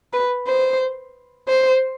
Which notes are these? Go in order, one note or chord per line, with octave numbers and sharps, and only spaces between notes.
B4
C5
C5